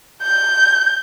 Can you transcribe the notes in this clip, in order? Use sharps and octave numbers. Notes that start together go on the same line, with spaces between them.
G6